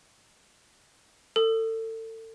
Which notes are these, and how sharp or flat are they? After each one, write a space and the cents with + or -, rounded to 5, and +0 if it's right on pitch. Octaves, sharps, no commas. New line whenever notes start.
A4 +30 D#6 +0